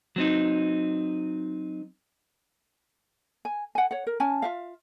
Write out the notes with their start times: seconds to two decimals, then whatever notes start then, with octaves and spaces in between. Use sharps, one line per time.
0.16 F#3 C4 D#4
3.45 G#5
3.75 F#5 G#5
3.91 C#5 F#5
4.07 A#4
4.20 C#4 G#5 A5
4.42 F4 E5 F5